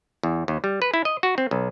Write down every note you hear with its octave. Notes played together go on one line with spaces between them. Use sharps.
E2
D#2
G3
B4
E4
D#5
F#4
C4
B1